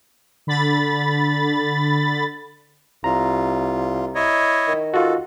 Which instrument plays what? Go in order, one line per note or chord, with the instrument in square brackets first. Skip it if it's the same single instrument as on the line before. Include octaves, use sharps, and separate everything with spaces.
[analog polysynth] D3 B5 A6
[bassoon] C2 [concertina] F4 [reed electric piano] A#5
[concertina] E4 C#5 D#5
[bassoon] D#3
[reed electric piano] F4 F#4 [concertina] A4